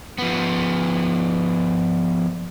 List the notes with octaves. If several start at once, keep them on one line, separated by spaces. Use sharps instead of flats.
F3 B3